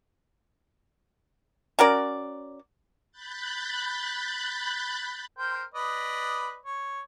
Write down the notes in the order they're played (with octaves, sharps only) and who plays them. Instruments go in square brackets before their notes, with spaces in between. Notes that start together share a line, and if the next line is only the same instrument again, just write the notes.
[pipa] C#4 F#4 A#4 D5
[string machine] B5 F#6 G6 A6
[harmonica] A#4 C5 G5
B4 D5 D#5
C#5